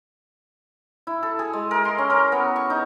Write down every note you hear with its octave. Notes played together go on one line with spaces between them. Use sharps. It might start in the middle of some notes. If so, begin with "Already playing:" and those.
E4
A4
G#4
G#3
A#4
C6
C#4
A#4
B3
C#6
D#4